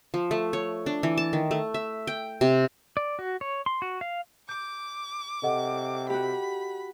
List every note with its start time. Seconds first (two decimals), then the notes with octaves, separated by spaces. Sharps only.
0.14 F3
0.31 A3
0.53 C#5
0.86 D4
1.03 E3
1.18 A5
1.33 D#3
1.51 A3
1.74 E5
2.07 G5
2.41 C3
2.97 D5
3.19 F#4
3.41 C#5
3.66 C6
3.82 F#4
4.01 F5
4.49 D6 G6
5.43 C3 A4 D#5 F#5
6.10 F#4 G4 B5